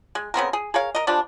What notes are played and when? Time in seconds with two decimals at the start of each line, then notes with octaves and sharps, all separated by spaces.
0.15 G#3
0.34 C#3 B3 C4 A#4
0.53 G#4
0.74 G#4 A#4 C#5 F5
0.95 A#4 D#5
1.07 F3 G3 G#3 D4